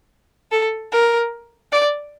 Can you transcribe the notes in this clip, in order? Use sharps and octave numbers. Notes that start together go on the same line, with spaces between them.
A4
A#4
D5